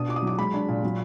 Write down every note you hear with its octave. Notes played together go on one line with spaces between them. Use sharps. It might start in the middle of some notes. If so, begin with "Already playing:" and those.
Already playing: B2 D4 D#6
F4 D6
D#6
F#3 D6
G#3 B5
D4
A#2
F#3